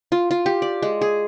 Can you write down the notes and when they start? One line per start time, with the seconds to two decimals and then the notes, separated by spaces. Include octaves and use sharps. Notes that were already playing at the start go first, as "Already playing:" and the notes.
0.12 F4
0.31 F4
0.46 G4
0.62 D5
0.82 G#3
1.01 G#4